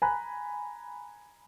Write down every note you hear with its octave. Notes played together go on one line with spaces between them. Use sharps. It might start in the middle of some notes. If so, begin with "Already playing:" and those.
G#5 A#5 B5 F#6